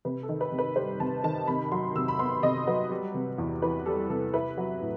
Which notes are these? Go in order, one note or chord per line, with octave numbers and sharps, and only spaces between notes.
C3 B4
A4
D#3
B4
C3
B4
G3 C5
C3 A5
D#3 A5
C3 B5
F#3 C6
C3 E6
B5
B3 C6
C3 D#5
F#3 B4
G3
C3
E2
E3 B4
G3 A4
C3 A4
E4 B4
F#3
A2